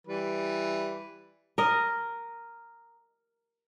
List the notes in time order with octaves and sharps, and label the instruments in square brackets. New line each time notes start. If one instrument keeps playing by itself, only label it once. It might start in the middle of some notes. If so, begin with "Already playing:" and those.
[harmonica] E3 G3 B4
[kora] A#4 D#5